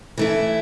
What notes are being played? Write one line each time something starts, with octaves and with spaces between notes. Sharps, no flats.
E3 A3 E4